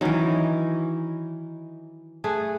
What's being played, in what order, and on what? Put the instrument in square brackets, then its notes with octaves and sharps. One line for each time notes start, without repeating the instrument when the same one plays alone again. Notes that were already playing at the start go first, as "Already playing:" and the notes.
[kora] D#3 F#3 C#4 [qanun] E3 D#4
[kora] A3 G#4 B4